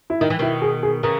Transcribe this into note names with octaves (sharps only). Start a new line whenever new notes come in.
E4
D#3 D#4
E3
B2 D#3 E4
G#4
G#4
C#3 E3 A#4